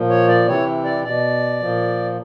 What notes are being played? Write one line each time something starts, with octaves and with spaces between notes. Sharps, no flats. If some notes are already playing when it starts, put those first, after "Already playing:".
Already playing: A#2 F3
C#5
D5
C3 E3 C#5
D5
B2 D5
A#2 F3